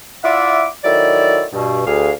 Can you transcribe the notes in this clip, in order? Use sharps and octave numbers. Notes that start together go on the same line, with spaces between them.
E4 F4 D5 E5 F#5 D6
D#3 F#3 E4 A4 D5
G2 B2
D2 G#4 F5